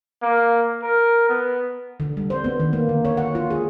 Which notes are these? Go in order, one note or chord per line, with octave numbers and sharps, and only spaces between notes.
A#3
A#4
B3
D3
G3
C5
B3
D#3
A#3
D3
C#5
F#5
F4
G#4